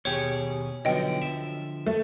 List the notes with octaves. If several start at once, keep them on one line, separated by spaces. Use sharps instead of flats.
D#2 B2 G4 G#4 C#5 G#5 C#6
B1 D3 F3 D#5 G5
E5
A3